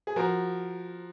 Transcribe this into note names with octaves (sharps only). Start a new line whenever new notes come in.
G#4
F3 F#4 A#4